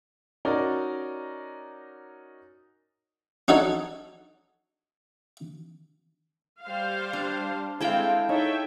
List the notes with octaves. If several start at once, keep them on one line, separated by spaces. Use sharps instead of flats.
C#4 D#4 F#4 A#4 D5
C#4 D#4 F#4 A4 C#5
G3 C5 F5
D4
G#3 C4 E4 A4 F5 G5 G#5
D#4 G#4 A4 C#5 E5 G5